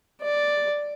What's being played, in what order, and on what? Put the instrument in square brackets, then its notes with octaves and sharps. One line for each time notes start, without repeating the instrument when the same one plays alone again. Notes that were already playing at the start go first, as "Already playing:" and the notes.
[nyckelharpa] D5